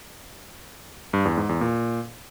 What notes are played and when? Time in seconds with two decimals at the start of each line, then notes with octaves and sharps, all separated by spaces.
1.13 G2
1.25 E2
1.37 G#2
1.49 E2
1.61 A#2